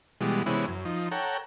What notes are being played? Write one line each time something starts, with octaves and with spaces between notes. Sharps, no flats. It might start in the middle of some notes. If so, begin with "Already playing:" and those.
B2 E3 G3 G#3
C3 E3 G#3 B3 C#4 E4
F#2
F3 D#4
A4 C#5 F#5 G5 A#5